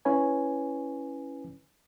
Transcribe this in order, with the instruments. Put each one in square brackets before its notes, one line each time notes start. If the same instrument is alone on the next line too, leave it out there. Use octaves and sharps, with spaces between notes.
[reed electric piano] C#4 E4 B4 C#5 G#5